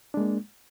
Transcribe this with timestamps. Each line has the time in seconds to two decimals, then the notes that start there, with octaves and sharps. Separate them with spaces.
0.14 D4
0.17 G#3
0.20 A#3